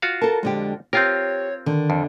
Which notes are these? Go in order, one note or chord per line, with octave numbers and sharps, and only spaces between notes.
F4 F#4 F5
A4 A#4 A5
F2 D3 G#3 G4
C4 F4 G4 A#4 C#5
D3 D#3
F2